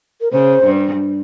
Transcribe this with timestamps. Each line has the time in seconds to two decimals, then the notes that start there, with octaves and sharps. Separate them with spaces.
0.21 A#4
0.32 C#3 C5
0.63 G2